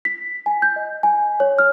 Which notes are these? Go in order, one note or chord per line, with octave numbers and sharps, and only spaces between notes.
B6
G#5
G6
D#5
G#5
C#5
F6